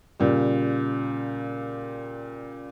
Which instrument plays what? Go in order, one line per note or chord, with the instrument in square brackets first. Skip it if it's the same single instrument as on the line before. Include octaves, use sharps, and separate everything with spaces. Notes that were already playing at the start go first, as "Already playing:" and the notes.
[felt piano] A#2 C#3 G3